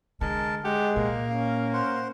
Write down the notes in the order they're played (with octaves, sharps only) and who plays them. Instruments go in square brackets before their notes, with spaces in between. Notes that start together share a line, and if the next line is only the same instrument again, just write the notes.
[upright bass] D3 [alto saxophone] G#3 [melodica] A#4 A5
[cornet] G#3 [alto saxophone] G4 [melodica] F#5
[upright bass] A#2 [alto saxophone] A#3
[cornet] C#4 [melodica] F5
[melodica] C5 F#5 C6